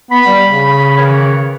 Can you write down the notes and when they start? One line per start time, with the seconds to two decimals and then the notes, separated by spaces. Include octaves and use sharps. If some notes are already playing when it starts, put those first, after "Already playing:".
0.11 B3 B5
0.26 G3
0.46 C#3
0.97 D#3 E3 C#5